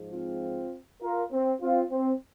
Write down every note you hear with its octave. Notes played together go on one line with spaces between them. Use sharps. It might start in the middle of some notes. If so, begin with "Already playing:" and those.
Already playing: G#2 F3 G#3
C4 F4
F4 A#4
C4
C4 F4
C4